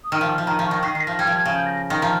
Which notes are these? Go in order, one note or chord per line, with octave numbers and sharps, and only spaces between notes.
D#6
D#3 F6
F3
C6
F3
D#3 A#5
F3
C#6
D#3
D#3 C7
D#3 C7
A#6
F3
G3 G#6
F3
G#6
C#3
G6
A#6
D#3 C6
F3 A#5